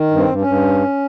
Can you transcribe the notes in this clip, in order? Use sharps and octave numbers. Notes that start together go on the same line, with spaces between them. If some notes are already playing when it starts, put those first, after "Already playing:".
Already playing: D#3
G2
C4
G2
C#4
G2